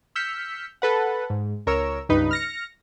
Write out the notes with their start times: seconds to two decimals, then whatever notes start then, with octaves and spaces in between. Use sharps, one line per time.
0.16 E6 F6 G6 B6 C#7
0.82 A4 B4 F#5
1.30 G#2
1.66 C#2 A#4 C#5 E6
2.09 C#2 G2 D#4 B4
2.31 F6 A#6 C#7